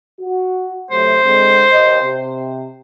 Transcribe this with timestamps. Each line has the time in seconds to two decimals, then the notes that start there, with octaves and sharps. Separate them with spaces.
0.20 F#4
0.91 C3 F#3 A3 C5
1.24 D3 G#3 C4
1.71 D#2 D#5
2.02 C3